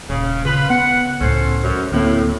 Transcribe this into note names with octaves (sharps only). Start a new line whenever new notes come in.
D#1 C#3
C#3 F4 B4
B3 F#5
C#2 A2 C#4 A4 C5
F#2
D2 A2 A#3 C4